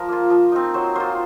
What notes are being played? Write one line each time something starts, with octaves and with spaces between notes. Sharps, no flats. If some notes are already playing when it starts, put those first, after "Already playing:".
Already playing: F3 A#4
A#3 F4
F3
C4 D#4
F#3 C5
A#3 F4 C5